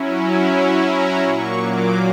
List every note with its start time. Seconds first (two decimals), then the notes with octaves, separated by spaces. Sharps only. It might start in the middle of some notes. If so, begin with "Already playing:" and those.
Already playing: F#3 C#4 E4
0.83 A#5
1.22 A#2 F#3 A#3 C#6
1.61 D6